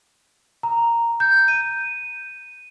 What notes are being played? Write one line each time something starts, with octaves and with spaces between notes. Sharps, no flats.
A#5
G6
D#7